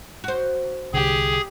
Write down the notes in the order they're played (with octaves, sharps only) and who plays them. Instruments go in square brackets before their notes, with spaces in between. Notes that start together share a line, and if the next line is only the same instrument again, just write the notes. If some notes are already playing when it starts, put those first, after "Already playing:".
[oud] F#4 C5
[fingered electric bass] C2 D3 [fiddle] G4 [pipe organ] G#4